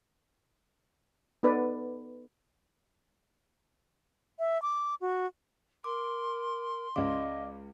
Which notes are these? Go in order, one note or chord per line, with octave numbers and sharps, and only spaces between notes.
B3 D#4 A4 B4 D5
E5
D6
F#4
A#4 C6 D6
C#2 C#3 D5 D#5 F5 D6